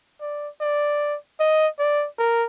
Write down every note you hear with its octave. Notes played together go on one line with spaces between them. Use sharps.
D5
D5
D#5
D5
A#4